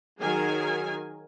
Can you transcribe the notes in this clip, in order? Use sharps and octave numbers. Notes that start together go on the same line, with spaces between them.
D#3 F#3 G#4 A#4 G#5